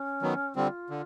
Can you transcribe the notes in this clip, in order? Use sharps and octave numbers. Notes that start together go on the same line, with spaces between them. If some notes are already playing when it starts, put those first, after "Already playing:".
Already playing: C#4
D#3 F#3 B3
D3 G3 C4 F4
D3